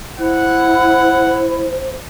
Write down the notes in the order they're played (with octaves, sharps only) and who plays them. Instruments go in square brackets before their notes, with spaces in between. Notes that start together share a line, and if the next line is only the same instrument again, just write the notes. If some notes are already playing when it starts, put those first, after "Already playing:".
[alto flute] E4 [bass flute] C5 [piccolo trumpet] F#5